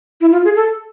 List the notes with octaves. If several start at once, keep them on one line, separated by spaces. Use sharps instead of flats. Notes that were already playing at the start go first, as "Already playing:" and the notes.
E4
F4
G#4
A4